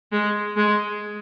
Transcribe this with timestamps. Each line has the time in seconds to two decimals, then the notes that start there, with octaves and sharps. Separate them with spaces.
0.12 G#3
0.56 G#3